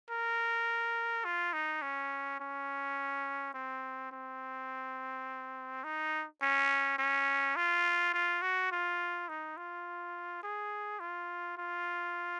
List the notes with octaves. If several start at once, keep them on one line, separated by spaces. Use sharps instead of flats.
A#4
F4
D#4
C#4
C#4
C4
C4
D#4
C#4
C#4
F4
F4
F#4
F4
D#4
F4
G#4
F4
F4